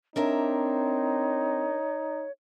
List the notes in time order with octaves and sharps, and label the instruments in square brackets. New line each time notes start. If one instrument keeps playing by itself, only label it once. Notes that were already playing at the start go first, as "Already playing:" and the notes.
[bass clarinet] C4 [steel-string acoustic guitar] D4 A#4 E5 [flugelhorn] D#4 [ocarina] C#5